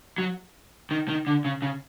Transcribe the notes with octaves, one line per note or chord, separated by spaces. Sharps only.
F#3
D#3
D#3
D3
C#3
C#3